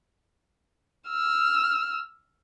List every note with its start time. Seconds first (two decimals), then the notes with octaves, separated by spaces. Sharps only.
1.08 E6 F6